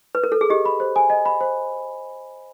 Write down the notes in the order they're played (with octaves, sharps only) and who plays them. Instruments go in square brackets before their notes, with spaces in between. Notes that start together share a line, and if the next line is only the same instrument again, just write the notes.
[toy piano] B4
A#4
A4
G#4
[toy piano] G4 [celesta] D#5
[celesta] B5
C5
G#5
D#5
B5
C5